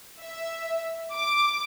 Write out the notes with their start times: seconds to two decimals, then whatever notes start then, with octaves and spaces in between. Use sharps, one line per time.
0.20 E5
1.14 D6